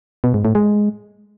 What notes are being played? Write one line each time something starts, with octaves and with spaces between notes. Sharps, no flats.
B2
G#2
A2
G#3